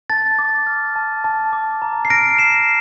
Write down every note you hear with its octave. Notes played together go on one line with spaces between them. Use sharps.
A5 A6
D6
F6
A5
A5
D6
A#5
C7
F6 A#6 D7
A#5 C7 E7